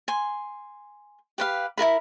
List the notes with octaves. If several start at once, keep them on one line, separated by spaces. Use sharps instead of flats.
G#5 C6
G4 B4 F5
E4 F4 A#4 B5